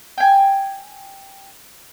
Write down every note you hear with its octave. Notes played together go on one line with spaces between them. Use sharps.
G5 G#5